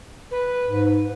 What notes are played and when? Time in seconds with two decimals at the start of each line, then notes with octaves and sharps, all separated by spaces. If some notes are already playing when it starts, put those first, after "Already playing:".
0.31 B4
0.65 G#2